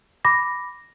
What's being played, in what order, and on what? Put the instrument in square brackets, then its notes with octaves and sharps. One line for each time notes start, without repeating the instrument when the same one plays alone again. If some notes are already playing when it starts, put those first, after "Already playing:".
[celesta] B5 D6 A#6